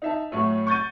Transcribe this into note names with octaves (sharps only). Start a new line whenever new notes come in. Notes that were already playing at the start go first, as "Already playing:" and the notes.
D#4 E5 A5
A2 F#3 A3 C#4
C#6 G6 A6 D#7